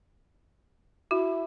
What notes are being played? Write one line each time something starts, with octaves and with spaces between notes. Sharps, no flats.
E4 F#4